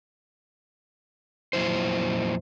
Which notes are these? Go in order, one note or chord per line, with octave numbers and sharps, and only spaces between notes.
F2 A#2 F#3 E4 C5